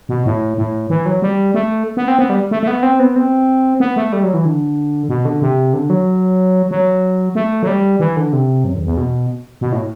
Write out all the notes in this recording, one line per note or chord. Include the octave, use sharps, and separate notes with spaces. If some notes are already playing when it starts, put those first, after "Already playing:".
B2
A2
A2
E3
F#3
G3
A3
B3
C4
B3
G3
A3
A3
B3
C4
B3
C4
B3
A3
G3
F#3
E3
D3
B2
D3
C3
D3
F#3
F#3
A3
F#3
G3
E3
D3
C3
F#2
E2
E2
B2
B2
A2